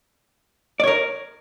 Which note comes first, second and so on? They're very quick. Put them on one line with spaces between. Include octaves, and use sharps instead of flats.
D5 C#5 A#4